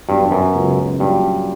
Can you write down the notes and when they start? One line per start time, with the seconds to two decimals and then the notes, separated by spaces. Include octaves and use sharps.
0.09 G2 F#3 B3 F#4
0.31 F#2
0.54 C#2 C#3 F#3 B3
1.00 G2 A#2 F#3 C#4 F#4